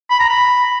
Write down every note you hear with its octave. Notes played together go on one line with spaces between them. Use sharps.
B5
A#5
B5